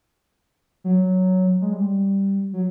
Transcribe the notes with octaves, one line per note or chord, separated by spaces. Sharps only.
F#3
G#3
G3
F#3